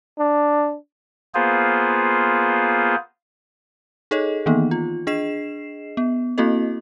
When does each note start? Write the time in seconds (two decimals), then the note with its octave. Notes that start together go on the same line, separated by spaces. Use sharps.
0.19 D4
1.34 A#3 B3 F4 G#4 C5
4.11 D#4 G#4 A4 C#5 D#5
4.46 D#3 E3 A#3 B3 D#4
4.71 F4
5.07 D4 G#4 D#5 C7 E7
5.97 B3
6.38 A#3 C4 E4 F#4 A4 D#5